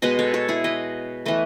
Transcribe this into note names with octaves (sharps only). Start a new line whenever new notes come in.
B2 G#3 B3 B4 D#5
A4 C#5
A4 C#5
E4 G#4
B4 D#5
E3 A3 B4 D#5